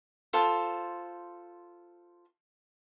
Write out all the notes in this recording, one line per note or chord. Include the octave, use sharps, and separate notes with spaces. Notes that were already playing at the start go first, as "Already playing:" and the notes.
F4 A4 C5